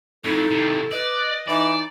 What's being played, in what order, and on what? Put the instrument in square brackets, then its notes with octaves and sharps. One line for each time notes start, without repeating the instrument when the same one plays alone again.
[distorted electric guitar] F2 A2 [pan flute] D#4 [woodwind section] E4 A4
[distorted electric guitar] D#2 C3
[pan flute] B4 [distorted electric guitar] D5 [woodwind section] D#5
[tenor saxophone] E3 [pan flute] D#4 [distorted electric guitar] D5